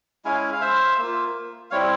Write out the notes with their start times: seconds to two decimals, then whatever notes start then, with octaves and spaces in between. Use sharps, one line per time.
0.25 G#3 C#4 E4 F5 G#5
0.53 F5
0.61 C5 E5
0.98 A#3 F4
1.71 G3 C4 E4 C#5 F5